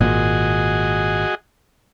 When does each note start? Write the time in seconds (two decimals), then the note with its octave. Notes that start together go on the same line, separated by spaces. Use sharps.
0.01 G#1 A#2 F#4 G#4 D#5